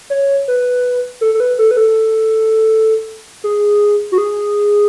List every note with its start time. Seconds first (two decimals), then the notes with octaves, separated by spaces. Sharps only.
0.10 C#5
0.48 B4
1.21 A4
1.34 A4
1.40 B4
1.59 A4
1.71 B4
1.77 A4
3.44 G#4
4.12 F#4
4.18 G#4